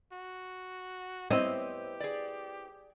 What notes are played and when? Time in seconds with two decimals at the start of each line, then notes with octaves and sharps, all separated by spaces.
0.12 F#4
1.31 B3 C4 E4 G4 C5 C#5 D#5
2.00 G#4 D5